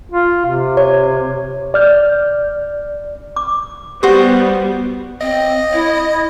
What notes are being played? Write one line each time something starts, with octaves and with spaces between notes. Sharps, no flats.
F4
C3
C#5
D5 F6 G6
D6
G3 B3 F#4 G4 C5 D#6
C4 D#5
E4